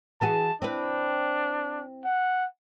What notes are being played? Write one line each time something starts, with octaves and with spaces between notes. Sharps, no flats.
E3 F#4 G#4 A5
C4 D4 E4 B4
F#5